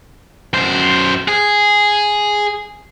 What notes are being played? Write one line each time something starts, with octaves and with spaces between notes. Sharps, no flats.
F#2 C5
G#4